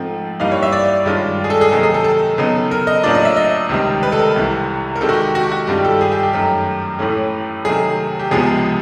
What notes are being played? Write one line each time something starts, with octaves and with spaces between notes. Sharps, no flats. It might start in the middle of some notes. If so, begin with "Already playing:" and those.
Already playing: G#2 F3 A3 C4
G2 E3 G3 A#3 D#4 F5
C#5
E5
D5
G2 D#3 G#3 C#4 F4
G#4
A4
G#4
C3 D#3 F#3 A#3 D#4 A4
G#4
A4
A4
C#3 F#3 B3 D#4
A#4
D#5
A2 F#3 A#3 D4 F4 D5
D#5
E5
D#5
C#2 C3 D#3 G3 C4
B4
A4
A#4
C2 C3 E3
A#4
C3 D#3 G#3 A4
F#4
G4
F#4
G4
F#4
G2 D#3 G3 C4 F4 G4
A4
G#4
G4
G4
F#2 D#3 F#3 A3 G4
A2 E3 A3 C#4
C3 D#3 F#3 A3 G#4
G4
C#2 C3 F3 G#3 B3 G#4